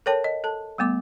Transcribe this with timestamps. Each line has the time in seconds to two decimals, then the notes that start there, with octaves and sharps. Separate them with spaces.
0.06 A4 A#4 C#5 G5 A5
0.24 D#5
0.44 A4 A5
0.78 G3 A3 B3 D6